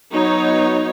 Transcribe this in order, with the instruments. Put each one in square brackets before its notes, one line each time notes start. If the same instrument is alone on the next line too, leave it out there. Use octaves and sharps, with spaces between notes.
[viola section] F#3 B3 D#4 C#5